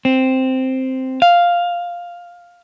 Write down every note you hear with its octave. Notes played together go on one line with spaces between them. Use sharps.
C4
F5